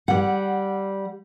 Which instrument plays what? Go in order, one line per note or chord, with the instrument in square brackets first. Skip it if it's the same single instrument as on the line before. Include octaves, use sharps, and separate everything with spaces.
[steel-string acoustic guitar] G3 F#5